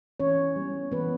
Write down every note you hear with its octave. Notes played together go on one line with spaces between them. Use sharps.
E3 C#4 C#5
G3 B3
E3 B3 B4